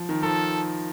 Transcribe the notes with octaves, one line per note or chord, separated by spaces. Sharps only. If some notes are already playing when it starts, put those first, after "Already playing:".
Already playing: F3
D#3
F3 A4